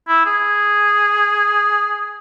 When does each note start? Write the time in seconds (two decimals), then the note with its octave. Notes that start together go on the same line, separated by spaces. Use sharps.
0.08 E4
0.26 G#4